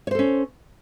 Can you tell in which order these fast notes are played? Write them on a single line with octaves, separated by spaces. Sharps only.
C#5 C5 A4 C#4